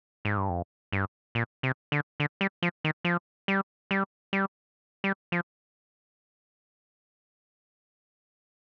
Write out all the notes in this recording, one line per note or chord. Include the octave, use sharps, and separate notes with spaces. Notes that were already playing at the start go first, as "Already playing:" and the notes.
G#2
G2
F2
G2
A#2
C3
D3
D3
G3
F3
D#3
F3
G3
G3
G3
G3
F3